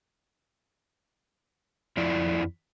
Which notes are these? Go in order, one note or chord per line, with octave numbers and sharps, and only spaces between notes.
F2 F3 E4 D5